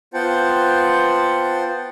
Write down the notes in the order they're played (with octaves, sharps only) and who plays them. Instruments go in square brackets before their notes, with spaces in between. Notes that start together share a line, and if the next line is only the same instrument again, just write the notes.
[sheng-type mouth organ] B3 F4 C5 F#5 G5 A5